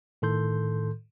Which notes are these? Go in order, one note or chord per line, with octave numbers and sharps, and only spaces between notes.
A2 D#3 A4 C6 G6